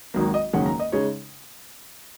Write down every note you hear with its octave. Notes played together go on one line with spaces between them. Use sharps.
G#1 G#2 D#3 F#3 A#3
D#5
F#1 F#2 D#3 G#3 C#4 F#5
A#5
D#5
C#3 G#3 D#4 C#5